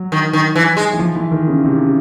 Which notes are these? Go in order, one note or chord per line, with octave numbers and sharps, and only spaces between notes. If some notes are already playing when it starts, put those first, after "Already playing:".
Already playing: F#3
D#3
D#3
E3
G#3
E3
F3
E3
D#3
C#3
C3
C#3